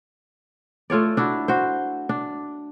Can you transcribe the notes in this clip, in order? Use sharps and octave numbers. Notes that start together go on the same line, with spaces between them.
A3 F4 C#5 D5
D4 E4 F#4
F#4 C5
D4